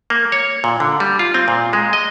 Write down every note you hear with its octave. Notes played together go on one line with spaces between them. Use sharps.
A#3
C#5
A#2
D3
G3
F4
C4
A#2
G#3
D#5